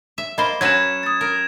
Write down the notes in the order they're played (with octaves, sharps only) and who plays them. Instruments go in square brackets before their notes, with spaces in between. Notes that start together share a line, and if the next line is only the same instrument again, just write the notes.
[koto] E5
[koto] A#3 C5 [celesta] D#5 B5 G7
[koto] F#3 C#4 B4 [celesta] C#5 [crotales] G#6 E7
[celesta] D#6 A6
[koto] A#4